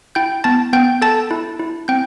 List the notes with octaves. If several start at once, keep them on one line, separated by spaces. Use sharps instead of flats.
E4 G5 G6
B3 A5 A6
B3 G5 G6
A4 A5 A6
E4
E4
C4 G5 G6